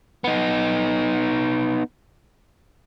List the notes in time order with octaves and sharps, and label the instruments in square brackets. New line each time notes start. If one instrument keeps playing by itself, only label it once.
[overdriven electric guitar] B3 D#4